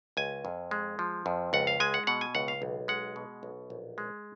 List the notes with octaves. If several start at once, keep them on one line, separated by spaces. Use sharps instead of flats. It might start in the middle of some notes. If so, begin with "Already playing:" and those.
C#2 G#5
F2
G#3
F3
F2
C#2 F#5
F5
G#3 G#5
F#5
B2 F#5
G#5
C#2 F#5
F5
B1
G#3 F#5
B2
B1
A#1
G#3